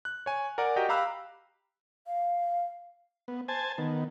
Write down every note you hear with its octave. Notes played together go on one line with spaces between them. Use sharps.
F#6
C#5 G#5
A#4 D5 F#5 G#5
F#4 G4 D#5 G5
G4 F5 A#5 B5 E6 F#6
F5
B3
C5 G#5 A5
D#3 B3